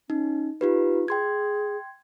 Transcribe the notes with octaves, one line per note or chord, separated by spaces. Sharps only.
C#4 D#4
D#4 F4 G4 B4
G#4 G5 C6 G#6